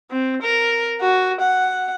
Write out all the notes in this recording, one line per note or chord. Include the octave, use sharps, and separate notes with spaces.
C4
A#4
F#4
F#5